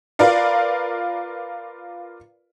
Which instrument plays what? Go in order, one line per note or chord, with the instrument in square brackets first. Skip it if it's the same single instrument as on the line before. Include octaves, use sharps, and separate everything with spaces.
[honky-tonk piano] F4 A#4 B4 D5 F5